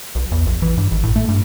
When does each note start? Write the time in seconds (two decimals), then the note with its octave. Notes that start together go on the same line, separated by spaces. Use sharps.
0.15 B1
0.32 E2
0.46 A#1
0.62 E3
0.78 G2
0.91 G#1
1.03 A2
1.16 A3
1.29 G2